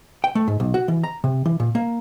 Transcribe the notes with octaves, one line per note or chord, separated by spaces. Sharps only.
G5
A3
G#2
B1
F#4
E3
A#5
C3
E3
A#2
A#3